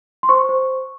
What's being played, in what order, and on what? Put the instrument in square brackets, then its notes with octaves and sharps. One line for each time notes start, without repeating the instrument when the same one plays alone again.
[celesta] C6
C5 C#6
C5